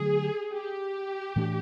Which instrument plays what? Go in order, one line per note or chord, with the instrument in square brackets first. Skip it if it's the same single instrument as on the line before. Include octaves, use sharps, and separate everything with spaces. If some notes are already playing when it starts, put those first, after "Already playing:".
Already playing: [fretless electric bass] D3 F#3 A3 [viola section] G#4
[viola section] G4
[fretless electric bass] A2 E3 A3 D4